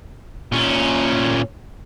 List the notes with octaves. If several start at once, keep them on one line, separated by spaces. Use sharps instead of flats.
A#2 C#4